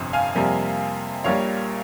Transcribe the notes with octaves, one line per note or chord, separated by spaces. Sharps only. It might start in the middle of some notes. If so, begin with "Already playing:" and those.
Already playing: G1 F2 C3
F5 G#5
F2 C3 G3 A#3
A#1 A#2 G3 A#3 C#5 F5